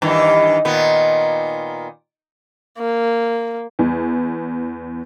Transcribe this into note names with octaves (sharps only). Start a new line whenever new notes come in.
G2 D#3 E3
A#2 D#3 B3
A#3
E2